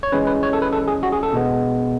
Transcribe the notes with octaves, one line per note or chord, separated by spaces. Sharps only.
C#5
E3 G#3 C#4 B4
B4
C#5
A4
B4
A4
G#4
F#4
G#4
A4
B2 G#3 B3